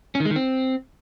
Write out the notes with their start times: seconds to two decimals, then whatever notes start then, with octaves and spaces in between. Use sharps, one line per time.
0.15 C#4
0.20 D#3
0.25 G#3
0.31 D#3
0.36 C4